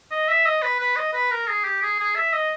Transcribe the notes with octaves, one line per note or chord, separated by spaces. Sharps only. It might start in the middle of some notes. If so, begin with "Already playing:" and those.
D#5
E5
D#5
B4
B4
D#5
B4
A#4
G#4
G4
G#4
G#4
E5
D#5